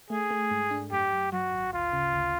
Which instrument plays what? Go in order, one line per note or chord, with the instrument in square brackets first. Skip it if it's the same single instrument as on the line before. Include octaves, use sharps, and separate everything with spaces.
[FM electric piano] A3 [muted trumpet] G#4
[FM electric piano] A3
G#2
D4
[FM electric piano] F#2 [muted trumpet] G4
[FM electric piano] F#2
[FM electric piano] F#3 [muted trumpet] F#4
[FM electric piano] G#1
[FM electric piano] D2 [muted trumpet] F4
[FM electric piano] C#3
D2